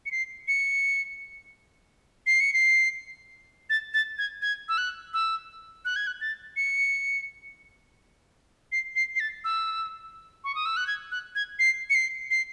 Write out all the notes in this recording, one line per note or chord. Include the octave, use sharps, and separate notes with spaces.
C#7
C7
C#7
C7
C#7
C7
A6
A6
G#6
G#6
E6
F#6
E6
F#6
G#6
F#6
A6
C#7
C7
C7
C7
A6
E6
C#6
D#6
E6
F#6
G#6
F#6
G#6
C7
C#7
C7
C7